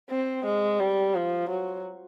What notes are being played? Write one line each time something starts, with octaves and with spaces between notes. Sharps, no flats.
C4
G#3
G3
F3
F#3